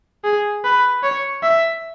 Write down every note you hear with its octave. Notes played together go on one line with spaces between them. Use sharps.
G#4
B4
C#5
E5